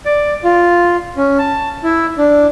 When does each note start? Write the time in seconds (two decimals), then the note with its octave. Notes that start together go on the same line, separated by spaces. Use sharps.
0.06 D5
0.44 F4
1.17 C#4
1.39 A5
1.84 E4
2.18 D4